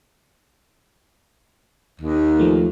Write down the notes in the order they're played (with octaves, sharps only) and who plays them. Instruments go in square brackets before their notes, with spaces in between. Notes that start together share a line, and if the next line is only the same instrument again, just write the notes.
[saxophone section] D#2
[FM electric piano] F3 A3